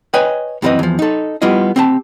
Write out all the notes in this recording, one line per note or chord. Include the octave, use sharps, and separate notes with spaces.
B4 C#5 D#5 G5 G#5
F#2 E3 C4 A#4 B4 D#5
E2 F3
D#4 A4
G3 B3 E4 F4 D#5
C4 G4 A5